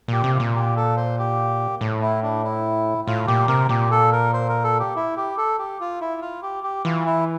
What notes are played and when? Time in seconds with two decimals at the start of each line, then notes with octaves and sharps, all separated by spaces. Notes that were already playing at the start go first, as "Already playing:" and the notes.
0.08 A#2 G4
0.24 C3
0.34 F4
0.40 A#2
0.55 G4
0.76 A4
0.97 C5
1.18 G4
1.81 A2
2.01 E4
2.23 D4
2.44 E4
3.07 A2 F4
3.27 A#2 G4
3.48 C3 A#4
3.69 A#2 G4
3.91 A4
4.12 A#4
4.33 C5
4.49 A#4
4.64 A4
4.80 G4
4.96 E4
5.17 G4
5.38 A4
5.59 G4
5.80 F4
6.01 E4
6.22 F4
6.43 G4
6.64 G4
6.85 E3 F4
7.06 E4